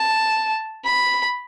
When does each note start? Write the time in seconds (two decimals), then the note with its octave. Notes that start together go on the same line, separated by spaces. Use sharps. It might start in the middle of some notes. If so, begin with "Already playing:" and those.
Already playing: A5
0.85 B5